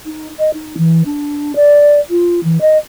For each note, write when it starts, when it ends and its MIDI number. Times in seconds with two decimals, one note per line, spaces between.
0.05 0.28 63
0.39 0.52 75
0.53 0.75 63
0.77 1.02 52
1.05 1.55 62
1.55 1.99 74
2.09 2.42 65
2.43 2.60 52
2.61 2.77 75